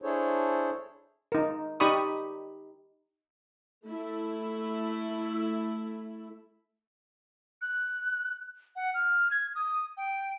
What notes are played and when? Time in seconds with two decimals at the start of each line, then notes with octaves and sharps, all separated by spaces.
0.02 D4 E4 G#4 A4 C5 C#5
1.32 D#4 A#4
1.80 D#4 G4 D5 B5 C#6 D#6
3.85 A3 E4
7.62 F#6
8.76 F#5
8.94 F6
9.31 G#6
9.55 D#6
9.97 G5